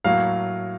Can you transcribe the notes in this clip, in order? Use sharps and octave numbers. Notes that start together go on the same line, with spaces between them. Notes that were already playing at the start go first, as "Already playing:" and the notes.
A2 F#3 A#3 F5